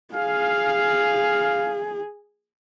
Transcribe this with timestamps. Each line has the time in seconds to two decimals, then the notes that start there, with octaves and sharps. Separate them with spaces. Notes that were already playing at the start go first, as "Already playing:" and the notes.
0.14 G#4 F5